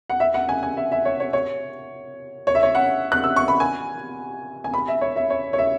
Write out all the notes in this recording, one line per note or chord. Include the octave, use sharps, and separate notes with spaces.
F#5
E5
F#5
G#5
G#5
E5
E5
C#5
C#5
C#5
C#5
E5
C#5
F#5
F#6
E6
C#6
B5
G#5
G#5
B5
E5
C#5
E5
C#5
C#5
E5